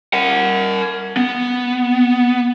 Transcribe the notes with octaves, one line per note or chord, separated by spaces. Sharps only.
A#4 F#5
B3